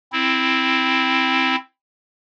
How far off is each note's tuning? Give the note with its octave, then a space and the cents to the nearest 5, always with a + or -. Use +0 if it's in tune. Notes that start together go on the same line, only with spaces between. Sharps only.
C4 +5 E4 +0